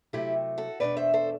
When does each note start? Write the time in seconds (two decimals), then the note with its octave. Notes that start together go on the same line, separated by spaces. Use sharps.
0.13 C3 F#3 A3 E4 G4
0.58 F#4 A4
0.80 E2 B2 A3 D4 B4 D5
0.97 C5 E5
1.14 A4 C5